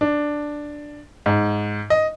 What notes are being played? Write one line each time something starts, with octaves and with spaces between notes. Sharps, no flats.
D4
G#2
D#5